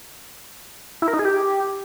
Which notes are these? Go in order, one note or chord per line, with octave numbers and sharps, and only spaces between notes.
E4
A#4
D#4
G#4
G4